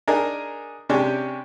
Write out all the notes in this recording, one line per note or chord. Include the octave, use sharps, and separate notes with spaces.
D4 D#4 G#4 A#4
C3 G#3 C#4 D4 G4